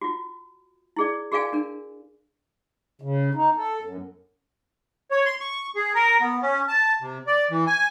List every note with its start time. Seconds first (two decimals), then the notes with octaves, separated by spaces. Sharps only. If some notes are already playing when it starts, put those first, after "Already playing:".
0.01 F4 F#4
0.97 E4 G#4 D5
1.32 F#4 G#4 A#4 D5 F5 G#5
1.53 D4 A#4
3.02 C#3
3.35 D#4
3.56 A4
3.83 F#2
5.11 C#5
5.26 C6
5.40 C#6
5.76 G#4
5.94 A#4
6.21 B3
6.42 C#4
6.68 A5
7.01 C3
7.27 D5
7.50 E3
7.67 G#5